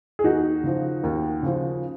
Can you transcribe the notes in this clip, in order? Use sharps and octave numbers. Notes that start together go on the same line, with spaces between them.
G#4
D#2 D#4 F#4
C#3 F3
D#2
C#3 F3